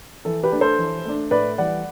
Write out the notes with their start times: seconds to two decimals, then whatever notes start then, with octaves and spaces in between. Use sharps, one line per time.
0.25 E3 A4
0.43 G4 B4
0.52 A3 D4
0.61 A4 C5
0.78 E3
1.05 A3 D4
1.31 A2 B4 D5
1.58 E3 G3 D5 F#5